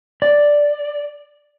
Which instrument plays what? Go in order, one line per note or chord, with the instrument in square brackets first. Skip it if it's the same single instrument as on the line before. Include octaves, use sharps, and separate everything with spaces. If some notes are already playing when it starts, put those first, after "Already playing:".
[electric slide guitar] D5